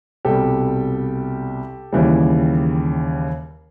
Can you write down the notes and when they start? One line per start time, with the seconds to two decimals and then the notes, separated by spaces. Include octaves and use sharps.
0.25 C2 B2 G3 G4 A4
1.92 D#2 C#3 E3 G3